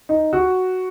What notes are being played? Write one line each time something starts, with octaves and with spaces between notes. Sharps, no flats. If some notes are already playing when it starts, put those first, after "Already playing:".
D#4
F#4